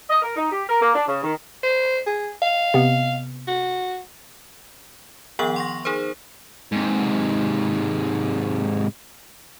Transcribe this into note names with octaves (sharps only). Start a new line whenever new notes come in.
D#5
A#4
D#4
G4
A#4
A#3
D4
C#3
D#3
C5
G#4
F5
C3 B3
F#4
D#3 F3 B3 F#5 G5 F#7
C6 C#6 A#6
D#4 G#4 A#4 C5
G#2 C3